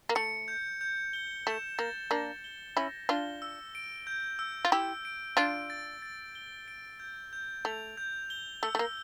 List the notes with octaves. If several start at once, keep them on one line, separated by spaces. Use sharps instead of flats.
A#3
A3 C#7
G6
G6
G7
A3 E7
A#3 A6
A#3 D4 A6
G7
C#4 E4 A#6
D4 F4 G7
E6
D7
G6
E6
F4
E4 G4 E6
D7
D4 F4 D7
A6
A6
G7
D7
G6
G6
A3 F7
G6
G7
A3 E6
A3
A#3